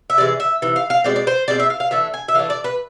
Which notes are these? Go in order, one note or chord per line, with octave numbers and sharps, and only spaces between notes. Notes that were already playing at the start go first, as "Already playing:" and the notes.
E5
C3 E3 G#3 D5
E5
C3 E3
F5
F5
B2 G#3 C4 D5
D5
C5
B2 G#3 C4 D5
E5
F5
F5
E3 A3 D4 E5
G#5
E5
E3 A3 D4 F5
D5
B4